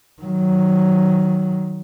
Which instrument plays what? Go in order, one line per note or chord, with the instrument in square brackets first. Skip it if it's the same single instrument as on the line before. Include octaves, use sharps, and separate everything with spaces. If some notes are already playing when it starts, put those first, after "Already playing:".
[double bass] D#3 F#3